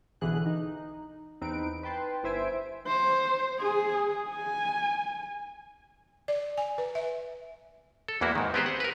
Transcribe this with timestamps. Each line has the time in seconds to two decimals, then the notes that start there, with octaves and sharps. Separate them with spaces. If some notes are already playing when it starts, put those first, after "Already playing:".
0.21 B1 B2 D3 E3 G#4 F#6
0.46 D#4
1.41 E2 C4 D#4 B4 D7
1.83 B4 G5 A5 C6
2.23 G1 E4 C5 E5 G#5 D7
2.87 C5
3.60 G#4
4.30 G#5
6.28 D5
6.58 G#5
6.78 B4
6.95 E5
8.08 A4
8.21 E2 E3 A#3 E4 F#4
8.35 G#2 D#3
8.54 B3 C4 G4 G#4 B4 C5
8.66 F#5
8.80 A#4 B4